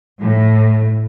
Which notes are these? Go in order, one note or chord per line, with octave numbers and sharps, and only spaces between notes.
A2